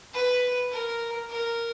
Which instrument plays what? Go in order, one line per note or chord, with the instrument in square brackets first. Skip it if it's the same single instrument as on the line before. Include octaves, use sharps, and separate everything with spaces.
[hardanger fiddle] B4
A#4
A#4